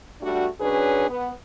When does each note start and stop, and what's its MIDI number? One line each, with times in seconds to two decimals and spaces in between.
0.21 0.48 55
0.21 0.48 57
0.21 0.48 62
0.21 0.48 66
0.61 1.09 54
0.61 1.09 61
0.61 1.09 62
0.61 1.09 68
0.61 1.09 71
1.09 1.31 59